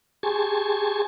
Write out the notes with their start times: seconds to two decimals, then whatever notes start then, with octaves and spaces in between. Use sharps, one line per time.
0.23 G4 G#4 G#5 A5 C6 C#6